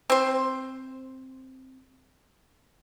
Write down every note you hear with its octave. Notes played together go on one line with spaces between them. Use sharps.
C4 C5